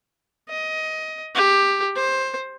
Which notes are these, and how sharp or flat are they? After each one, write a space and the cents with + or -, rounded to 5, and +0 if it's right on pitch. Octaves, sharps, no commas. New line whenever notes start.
D#5 +20
G4 +10
C5 +15